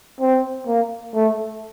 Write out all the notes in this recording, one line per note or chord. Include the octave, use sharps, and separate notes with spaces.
C4
A#3
A3